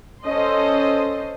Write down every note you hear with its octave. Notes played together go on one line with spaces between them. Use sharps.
C#4 A4 C5 D#5 C6